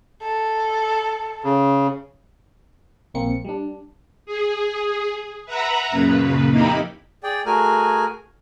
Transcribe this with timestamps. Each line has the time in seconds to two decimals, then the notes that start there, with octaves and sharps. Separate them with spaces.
0.22 A4
1.44 C#3
3.14 A#1 A#3 C4 C#7
3.45 G3 D4
4.26 G#4
5.45 B4 E5 F#5 A#5 B5
5.90 F#2 A#2 C#3 B4
6.50 F2 A#3 D#4 E4 G4 B5
7.23 G#4 D5 G5
7.46 A3 F#4 G#4 A#4 G#5